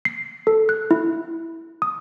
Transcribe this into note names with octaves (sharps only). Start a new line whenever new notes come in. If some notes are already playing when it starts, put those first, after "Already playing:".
C7
A4
F#6
E4
D#6